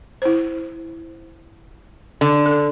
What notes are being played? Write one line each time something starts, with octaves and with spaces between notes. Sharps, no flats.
E4 C5
D3
A4